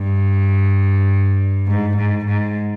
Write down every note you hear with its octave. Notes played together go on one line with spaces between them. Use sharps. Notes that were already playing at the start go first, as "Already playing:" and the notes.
Already playing: G2
G#2
G#2
G#2